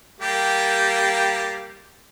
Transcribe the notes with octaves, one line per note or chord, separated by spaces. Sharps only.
G3 A#3 G4